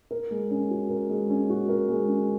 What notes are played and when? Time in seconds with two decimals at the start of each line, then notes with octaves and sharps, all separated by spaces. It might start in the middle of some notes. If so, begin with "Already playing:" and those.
0.11 A#4
0.31 G#3
0.50 C#4
0.71 F#4
0.90 A#4
1.09 G#3
1.30 C#4
1.50 F#4
1.69 A#4
1.89 G#3
2.08 C#4